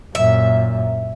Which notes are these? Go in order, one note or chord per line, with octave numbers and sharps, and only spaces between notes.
F#2 A#2 E5